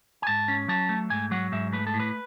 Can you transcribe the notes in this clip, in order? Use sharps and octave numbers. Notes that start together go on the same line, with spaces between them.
G#5
G#2 A5
C#4
F#3 A5
A3
G#2 G#5
F#3 F#5
G#2 E5
A3 B4
A4
A2
B4